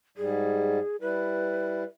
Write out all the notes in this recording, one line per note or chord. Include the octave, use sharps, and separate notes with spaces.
G#2 G3 G#4
G3 E4 B4